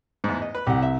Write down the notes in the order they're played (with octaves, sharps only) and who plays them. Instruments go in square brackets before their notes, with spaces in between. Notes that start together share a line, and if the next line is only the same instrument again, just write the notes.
[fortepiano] E2 G#2
D#5
B4
[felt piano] C2 [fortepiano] G4 F#5
[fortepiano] E5